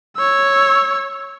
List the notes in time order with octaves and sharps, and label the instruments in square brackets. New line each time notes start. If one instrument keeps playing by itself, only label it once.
[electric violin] C#5 E6